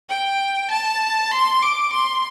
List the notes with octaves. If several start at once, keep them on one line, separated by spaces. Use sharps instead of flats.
G5
A5
C6
D6
C6